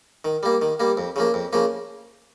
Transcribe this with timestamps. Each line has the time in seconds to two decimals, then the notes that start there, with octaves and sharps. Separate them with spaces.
0.25 D#3
0.43 G3 A#3
0.62 D#3
0.80 G3 A#3
0.97 F2
1.16 C#3 F3 A#3
1.34 F2
1.53 C#3 F3 A#3